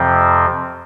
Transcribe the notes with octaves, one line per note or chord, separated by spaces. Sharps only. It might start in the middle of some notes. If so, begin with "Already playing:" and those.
Already playing: F2 C3 F3 C4